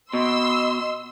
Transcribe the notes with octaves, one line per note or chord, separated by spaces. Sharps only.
B2 D#5 C6 E6